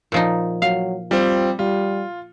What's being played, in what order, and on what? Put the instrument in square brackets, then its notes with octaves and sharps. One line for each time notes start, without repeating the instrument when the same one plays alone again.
[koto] A#2 F3 D#4
[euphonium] F#3 [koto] F5
[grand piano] G3 C4 [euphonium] F4
[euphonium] G3 [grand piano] F4